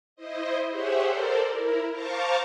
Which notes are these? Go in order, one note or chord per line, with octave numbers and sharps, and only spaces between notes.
E4 C5 D#5
G4 G#4 C5 C#5 E5 F#5
A4 A#4 C5 D5
E4 A#4
C5 F5 A5 A#5 C#6 D6